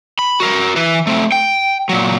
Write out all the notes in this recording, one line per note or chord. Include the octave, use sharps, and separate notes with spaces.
B5
F#4 A#4
E3 B4
A3 C4
G5
A#2 F#3